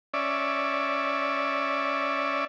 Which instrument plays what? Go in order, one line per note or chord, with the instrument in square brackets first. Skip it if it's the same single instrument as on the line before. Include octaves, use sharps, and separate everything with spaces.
[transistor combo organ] C#4 D5 E5